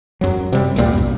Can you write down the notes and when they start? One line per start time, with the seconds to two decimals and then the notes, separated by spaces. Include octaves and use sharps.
0.21 F#2 F#3
0.52 C3 G3
0.76 A1 D2 A#2 G3
0.93 B1 F#2